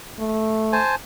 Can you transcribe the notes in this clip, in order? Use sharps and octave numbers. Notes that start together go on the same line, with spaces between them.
A3
C5 G#5 A5